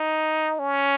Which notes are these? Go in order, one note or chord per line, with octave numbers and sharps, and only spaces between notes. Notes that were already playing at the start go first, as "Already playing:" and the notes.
Already playing: D#4
C#4